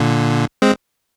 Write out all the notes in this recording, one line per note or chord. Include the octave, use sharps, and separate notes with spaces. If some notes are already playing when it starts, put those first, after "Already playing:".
Already playing: A#2 D3
G#3 C4